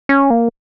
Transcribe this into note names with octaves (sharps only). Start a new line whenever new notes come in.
C#4
A#3